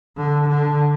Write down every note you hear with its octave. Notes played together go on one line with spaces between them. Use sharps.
D3
D3